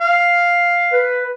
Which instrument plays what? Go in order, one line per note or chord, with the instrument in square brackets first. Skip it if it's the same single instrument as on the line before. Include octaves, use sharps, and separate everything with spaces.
[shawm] F5
[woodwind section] B4